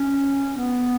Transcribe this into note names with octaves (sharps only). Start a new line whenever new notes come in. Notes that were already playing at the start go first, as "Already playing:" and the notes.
Already playing: C#4
B3